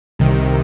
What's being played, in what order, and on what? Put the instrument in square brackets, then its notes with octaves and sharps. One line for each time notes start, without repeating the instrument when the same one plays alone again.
[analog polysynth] C2 C3 D#3